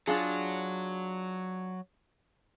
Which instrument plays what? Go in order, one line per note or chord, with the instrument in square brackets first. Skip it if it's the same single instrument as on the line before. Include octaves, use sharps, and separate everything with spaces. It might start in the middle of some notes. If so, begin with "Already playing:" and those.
[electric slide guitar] F#3 [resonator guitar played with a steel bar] D4 F4 G#4